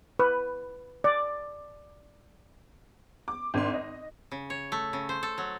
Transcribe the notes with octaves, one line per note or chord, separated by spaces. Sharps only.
B4
D5
D6
G#1 D4 C6
D#5
C#3
C#5
A3
C#3
C5
A4
F#3